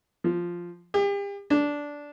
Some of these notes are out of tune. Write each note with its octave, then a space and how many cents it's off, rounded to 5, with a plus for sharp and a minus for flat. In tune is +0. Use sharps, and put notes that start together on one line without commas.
F3 -5
G4 +40
D4 -10